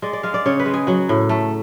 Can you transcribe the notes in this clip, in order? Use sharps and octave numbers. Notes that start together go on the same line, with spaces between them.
G#3 D5
D5
G#3 F5
D5
C#3 C#5
B4
G#3
G#4
F#3 F#4
A2
A3